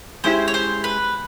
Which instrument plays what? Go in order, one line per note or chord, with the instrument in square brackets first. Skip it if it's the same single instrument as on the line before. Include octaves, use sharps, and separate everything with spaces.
[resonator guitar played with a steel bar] G#3 C#4 E4 G4 [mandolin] C5
[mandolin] C#5
C5
B4